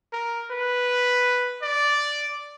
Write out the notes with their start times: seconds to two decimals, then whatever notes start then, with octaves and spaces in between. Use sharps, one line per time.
0.13 A#4
0.51 B4
1.62 D5